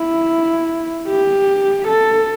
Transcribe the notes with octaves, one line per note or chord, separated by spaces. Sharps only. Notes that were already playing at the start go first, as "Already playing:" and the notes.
Already playing: E4
G4
A4